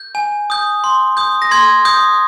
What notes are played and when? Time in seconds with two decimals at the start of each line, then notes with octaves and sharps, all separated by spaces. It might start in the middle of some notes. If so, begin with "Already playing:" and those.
Already playing: G6
0.15 G#5
0.50 D#6 G6
0.84 C6
1.17 D#6 G6
1.42 A#6
1.51 C6 G#6
1.85 D#6 G6